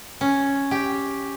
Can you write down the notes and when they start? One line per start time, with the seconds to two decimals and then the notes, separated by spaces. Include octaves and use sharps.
0.21 C#4
0.71 G4